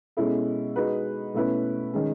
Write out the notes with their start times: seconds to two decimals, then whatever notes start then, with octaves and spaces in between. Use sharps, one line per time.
0.17 B2 G#3 C#4 E4 A4
0.76 G#3 D#4 F#4 B4
1.34 B2 A3 C#4 E4 B4
1.93 D#3 G#3 C#4